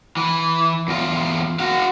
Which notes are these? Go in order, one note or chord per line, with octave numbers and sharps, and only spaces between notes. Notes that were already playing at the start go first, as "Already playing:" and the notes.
E3
E2 F4
F#4 F5